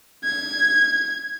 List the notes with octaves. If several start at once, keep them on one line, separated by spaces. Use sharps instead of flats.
G#6